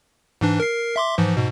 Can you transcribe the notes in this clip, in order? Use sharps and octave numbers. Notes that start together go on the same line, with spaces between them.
G#2 E3 D4
A#4 C7
E5 C6 D6
G#2 E3 F3
G#2 B2